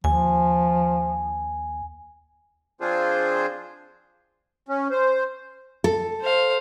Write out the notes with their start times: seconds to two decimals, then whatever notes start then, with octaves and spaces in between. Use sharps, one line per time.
0.04 D#2 F3 G#5
2.81 F3 C4 D4 F4 G#4 C5
4.69 C#4
4.91 C5
5.84 A4
6.21 C5 F5